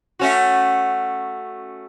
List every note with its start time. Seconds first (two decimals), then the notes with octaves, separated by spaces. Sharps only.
0.19 A3 C#4 F#4